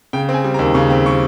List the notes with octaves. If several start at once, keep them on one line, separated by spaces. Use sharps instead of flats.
C#3 G5
C4
G#5
G3
A#5
D#2
C#3 C#6
C4
G3 C#6